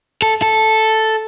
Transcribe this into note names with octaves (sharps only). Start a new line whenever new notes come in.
A4
A4